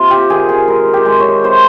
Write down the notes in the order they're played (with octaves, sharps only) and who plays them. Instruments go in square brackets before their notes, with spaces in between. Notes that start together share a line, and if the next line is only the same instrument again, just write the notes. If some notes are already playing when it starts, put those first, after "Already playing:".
Already playing: [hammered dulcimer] C3 F4
G4
D#3 G#4
G#4
G#3 A#4
G4
G#3
C#5
C3 C5